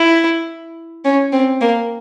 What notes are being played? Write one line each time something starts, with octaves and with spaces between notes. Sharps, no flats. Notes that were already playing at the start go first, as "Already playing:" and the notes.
Already playing: E4
C#4
C4
A#3